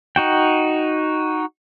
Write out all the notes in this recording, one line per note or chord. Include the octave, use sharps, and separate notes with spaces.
D#4 F#4 G5